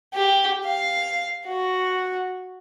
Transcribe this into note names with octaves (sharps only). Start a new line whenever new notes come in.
G4
F5
F#4